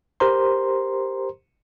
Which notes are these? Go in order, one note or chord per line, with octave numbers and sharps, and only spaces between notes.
G4 A#4 C5 A#5 C6